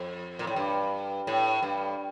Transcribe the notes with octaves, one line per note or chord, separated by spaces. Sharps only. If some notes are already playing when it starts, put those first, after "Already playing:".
Already playing: F2
A#2
A2
G2
A2
G2